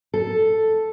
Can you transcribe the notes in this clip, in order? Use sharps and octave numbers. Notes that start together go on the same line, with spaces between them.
A4